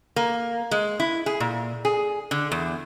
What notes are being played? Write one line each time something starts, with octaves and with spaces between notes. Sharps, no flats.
A#3
G#3
E4
G#4
A#2
G#4
D3
E2